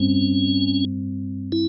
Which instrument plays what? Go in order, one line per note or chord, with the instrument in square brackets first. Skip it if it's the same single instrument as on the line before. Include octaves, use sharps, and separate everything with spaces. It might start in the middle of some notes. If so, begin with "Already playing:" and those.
Already playing: [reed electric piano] G2 G3 C4 [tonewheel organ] C#4
[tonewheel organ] E4